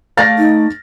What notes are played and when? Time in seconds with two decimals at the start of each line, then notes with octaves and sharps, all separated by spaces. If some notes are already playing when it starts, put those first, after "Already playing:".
0.17 A3 D5 F5 A6 A#6
0.38 D#4